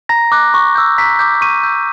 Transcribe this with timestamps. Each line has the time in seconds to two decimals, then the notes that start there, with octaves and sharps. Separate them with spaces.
0.09 A#5 A#6
0.32 D6 F#6
0.54 C#6
0.75 E6 G6
0.98 A#5 B6
1.19 D6 G6
1.41 C#6 D#7
1.63 E6 G6